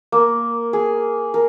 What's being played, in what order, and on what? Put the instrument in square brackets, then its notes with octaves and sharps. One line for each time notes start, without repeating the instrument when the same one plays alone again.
[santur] A#3
G#4
A#4